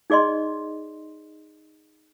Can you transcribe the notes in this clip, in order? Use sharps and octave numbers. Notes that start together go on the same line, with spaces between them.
D#4 G#4 D5 D#5 C6